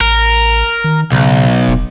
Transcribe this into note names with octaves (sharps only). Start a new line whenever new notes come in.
A1 A#4
D#3
B1 C#3
E1